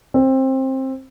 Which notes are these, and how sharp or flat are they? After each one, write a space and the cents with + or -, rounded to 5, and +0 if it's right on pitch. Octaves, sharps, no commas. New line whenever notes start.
C4 +20